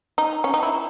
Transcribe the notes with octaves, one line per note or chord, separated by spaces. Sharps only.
D#4
C#4
D#4
E4